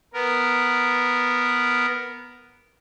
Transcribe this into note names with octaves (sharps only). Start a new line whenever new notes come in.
B3 A#4